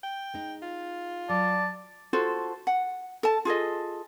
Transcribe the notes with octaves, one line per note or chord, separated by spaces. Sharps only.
G5
G#3 D#4
F4
F#3 D5 A5
F4 F#4 A4 C5
F#5
A4 A5
F4 G#4 A4 D#5